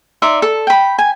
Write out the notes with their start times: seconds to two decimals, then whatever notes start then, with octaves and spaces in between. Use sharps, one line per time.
0.22 D#4 D5 E5 C6
0.42 A4
0.67 G5 B5
0.98 G#5